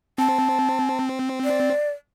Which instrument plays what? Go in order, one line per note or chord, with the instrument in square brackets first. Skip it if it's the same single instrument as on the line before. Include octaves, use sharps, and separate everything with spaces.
[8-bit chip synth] C4 [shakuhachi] A5
[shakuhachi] D5